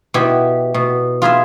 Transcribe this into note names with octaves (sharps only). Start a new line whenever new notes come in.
B2 E4 G4
B2
F4 G#4 B4 E5